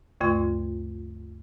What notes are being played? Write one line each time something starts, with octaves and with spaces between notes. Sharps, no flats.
D2 G2 C#3 A3 F4 C6